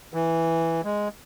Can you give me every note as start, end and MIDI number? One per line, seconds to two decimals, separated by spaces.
0.14 0.81 52
0.84 1.08 56